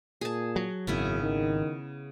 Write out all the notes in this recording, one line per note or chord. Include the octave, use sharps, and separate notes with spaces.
A#2 G#4 A5
F#3
G#1 F#2 C#3 B3 E4
D#3